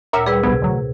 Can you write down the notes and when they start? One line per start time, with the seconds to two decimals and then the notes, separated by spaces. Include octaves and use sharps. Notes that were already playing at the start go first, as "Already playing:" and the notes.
0.13 D2 A#2 A#4 C#5 E5
0.26 G3 G#4 B4 E6
0.43 B1 G2 C3 B3 G#6
0.62 D2 F#3